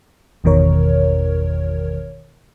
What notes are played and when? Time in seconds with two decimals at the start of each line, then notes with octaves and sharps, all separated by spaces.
0.44 G#1 E2 B2 D#3 A#4 C#5